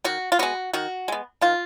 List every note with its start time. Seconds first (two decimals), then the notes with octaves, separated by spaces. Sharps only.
0.04 D#3 F#4
0.32 F4
0.39 G#3 B3 F#4
0.73 D#3 F#4
1.08 G#3 B3
1.41 D#3 F4